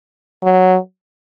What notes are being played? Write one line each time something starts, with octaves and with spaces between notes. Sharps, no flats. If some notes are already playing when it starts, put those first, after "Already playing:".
F#3